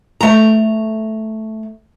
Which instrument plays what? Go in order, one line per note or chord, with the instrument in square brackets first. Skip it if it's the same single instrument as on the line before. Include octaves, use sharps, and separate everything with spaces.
[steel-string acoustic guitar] A3 A#5